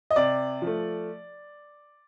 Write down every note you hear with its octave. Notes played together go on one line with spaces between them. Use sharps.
D#5
C3 D5
F3 A3